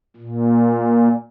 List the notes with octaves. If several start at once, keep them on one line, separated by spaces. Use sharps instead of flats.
A#2